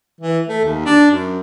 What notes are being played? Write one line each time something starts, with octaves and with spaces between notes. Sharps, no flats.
E3
A3
D#2
D4
F#2